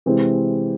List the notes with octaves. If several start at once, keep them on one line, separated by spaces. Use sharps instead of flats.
C3 E3 G#3 C4